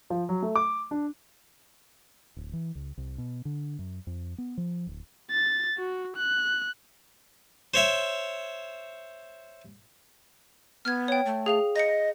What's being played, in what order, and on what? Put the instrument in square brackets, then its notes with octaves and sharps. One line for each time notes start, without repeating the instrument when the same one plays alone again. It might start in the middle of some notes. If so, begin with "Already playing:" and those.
[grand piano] F3
F#3
A3
D6
D4
[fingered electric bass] D1
E3
C#2
C2
B2
D3
F#2
F2
B3
F3
D1
[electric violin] A6
F#4
F#6
[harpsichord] C5 C#5 E5
[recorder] B3 [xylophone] F6 G#6
[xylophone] C#5 G5
[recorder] A3
[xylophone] G#4 F5 F7
[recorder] D#5 [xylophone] A#6 C#7